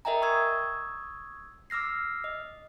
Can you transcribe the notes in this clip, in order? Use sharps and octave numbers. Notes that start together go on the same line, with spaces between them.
A#4 D#5 E5 G5 G#5 A#5
C#6 D#6 E6 G#6
D6 E6 F6 A#6 C7
D#5